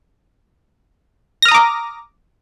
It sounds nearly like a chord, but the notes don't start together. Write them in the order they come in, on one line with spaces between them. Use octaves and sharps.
A#6 F6 D#6 A#5 D6